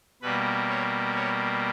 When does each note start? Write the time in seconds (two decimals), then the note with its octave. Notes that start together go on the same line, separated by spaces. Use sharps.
0.22 B2 G3 A#3 B4
0.69 C#5
1.15 C#5